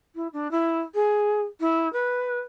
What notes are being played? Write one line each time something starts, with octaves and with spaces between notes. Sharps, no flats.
E4
D4
E4
G#4
E4
B4